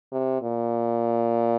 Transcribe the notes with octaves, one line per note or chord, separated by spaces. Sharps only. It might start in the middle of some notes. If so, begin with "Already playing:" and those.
C3
A#2